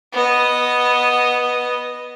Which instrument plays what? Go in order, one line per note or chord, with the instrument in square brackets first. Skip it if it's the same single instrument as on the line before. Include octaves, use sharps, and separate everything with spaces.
[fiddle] B3 D#5